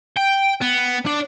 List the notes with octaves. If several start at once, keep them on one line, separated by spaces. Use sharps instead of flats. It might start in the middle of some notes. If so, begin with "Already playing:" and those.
G5
B3
D4